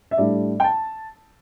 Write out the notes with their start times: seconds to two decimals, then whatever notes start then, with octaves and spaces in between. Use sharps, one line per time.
0.11 E5
0.17 A2 G3 D4 D5
0.60 G5
0.64 A5